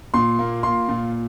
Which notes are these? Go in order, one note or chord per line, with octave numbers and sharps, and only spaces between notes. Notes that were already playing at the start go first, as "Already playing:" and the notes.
A#2 C6
A#3
F4 C6
A#2